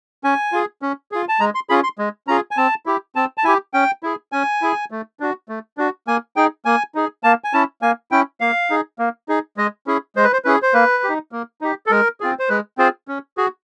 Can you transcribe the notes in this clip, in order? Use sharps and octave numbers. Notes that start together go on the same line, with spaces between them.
C#4 G#5
F4 G#4
C#4
F4 G#4
A5
G#3 A#5
C6
C#4 F4 G#4 B5
C6
G#3
C#4 F4 G#4 A#5
G#5
C4 A5
E4 G4
C4 A5
A5
E4 G4 G#5
C#4 G5
E4 G#4
C#4 G#5
E4 G#4
A3
D4 F#4
A3
D4 F#4
A#3 G#5
D#4 G#4 G5
A#3 G#5
D#4 G#4
A#3 A5
G#5
C#4 E4 A5
A#3 G#5
C#4 E4 G5
A#3 F5
D#4 G#4
A#3
D#4 G#4
G#3 D#5
C#4 E4 G#4
G#3 C5
B4
C5
C#4 E4 G#4 B4
C5
A#3 B4
G4
D#4
A#3
D#4 G4
A4
G#3 A#4
C4 F4 G#4
C5
G#3 B4
C4 F4 G#4 C5
C#4
F#4 G#4